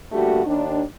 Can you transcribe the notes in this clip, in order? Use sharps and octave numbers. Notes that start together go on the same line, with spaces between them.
D3 G3 A3 A#3 F#4 G4
D#2 D4